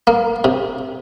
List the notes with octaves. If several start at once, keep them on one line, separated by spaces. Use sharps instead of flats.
A#3
C3